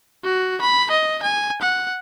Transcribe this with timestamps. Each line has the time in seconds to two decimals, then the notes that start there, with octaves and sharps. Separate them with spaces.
0.24 F#4
0.61 B5
0.91 D#5
1.23 G#5
1.62 F#5